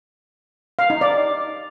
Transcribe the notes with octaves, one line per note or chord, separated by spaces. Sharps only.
F5
D#4
D5